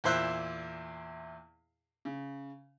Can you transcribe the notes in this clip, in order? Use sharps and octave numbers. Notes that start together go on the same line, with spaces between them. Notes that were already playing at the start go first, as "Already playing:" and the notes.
E2 A#2 E4 C5 E5 F#6
C#3